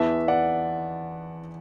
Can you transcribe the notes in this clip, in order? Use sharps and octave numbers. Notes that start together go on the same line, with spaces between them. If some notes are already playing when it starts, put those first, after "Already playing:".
Already playing: E2 E3 B3 E5 A5
D5 F#5